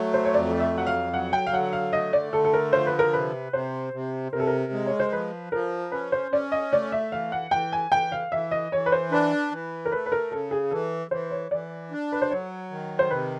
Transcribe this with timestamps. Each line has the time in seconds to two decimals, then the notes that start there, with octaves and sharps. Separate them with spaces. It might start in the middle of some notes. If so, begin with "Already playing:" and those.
Already playing: F#3 A3
0.14 C5
0.25 C#5
0.33 F2 D5
0.60 E5
0.73 F#3 F#5
0.87 F5
1.13 F#3 F#5
1.33 G5
1.47 F5
1.54 D3 F#5
1.73 F5
1.93 A3 D#5
2.13 D5
2.33 D3 A4
2.44 A4
2.53 A#4
2.73 F3 C5
2.87 B4
2.99 A#4
3.13 C3 B4
3.52 C3 C5
3.93 C3
4.32 C3 A#4
4.40 A4
4.47 A#4
4.72 G#3
4.86 C#5
5.00 C5
5.13 F3 B4
5.52 F3 A#4
5.92 C#4 B4
6.12 C5
6.32 C#4 D5
6.52 D#5
6.72 A3 D5
6.92 E5
7.12 E3 F5
7.32 F#5
7.51 E3 G5
7.72 G#5
7.91 E3 G5
8.12 F5
8.31 E3 E5
8.51 D#5
8.72 E3 C#5
8.86 B4
8.92 C5
9.12 D4 B4
9.51 E3
9.85 A#4
9.92 A3 B4
10.06 B4
10.12 A#4
10.31 C#3 A4
10.51 G#4
10.71 E3 A4
11.11 E3 C5
11.31 C#5
11.51 E3 D5
11.91 D4
12.12 B4
12.22 C5
12.31 F#3 C#5
12.71 D#3
12.99 C5
13.11 C3 B4